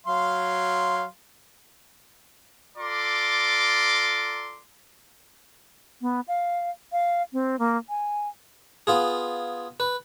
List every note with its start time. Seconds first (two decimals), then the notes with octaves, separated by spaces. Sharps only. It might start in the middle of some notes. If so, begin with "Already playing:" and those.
0.06 F#3 F5 C6
2.78 F4 A4 D5 A#5 C6 D6
6.01 B3
6.28 F5
6.92 F5
7.33 C4
7.59 A#3
7.89 G#5
8.87 B3 F4 G#4
9.80 B4